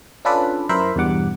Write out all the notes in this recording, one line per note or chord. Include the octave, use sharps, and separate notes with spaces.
C#4 D4 F4 A4 B4 D5
F#2 E4 A#4 C5 E5 B5
E2 G2 B2 G3 F#5 D6